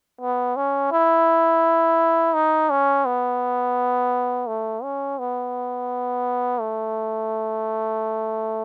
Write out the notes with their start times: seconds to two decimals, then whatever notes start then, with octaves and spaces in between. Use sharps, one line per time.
0.21 B3
0.57 C#4
0.92 E4
2.34 D#4
2.70 C#4
3.06 B3
4.47 A3
4.83 C#4
5.19 B3
6.60 A3